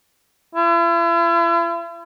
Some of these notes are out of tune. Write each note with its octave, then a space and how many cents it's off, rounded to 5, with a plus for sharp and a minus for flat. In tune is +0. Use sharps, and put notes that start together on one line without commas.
E4 +45